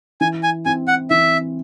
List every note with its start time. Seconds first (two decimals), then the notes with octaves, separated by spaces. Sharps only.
0.21 E3 G#5
0.43 G#5
0.66 C4 E4 G#5
0.88 F#5
1.10 E3 E5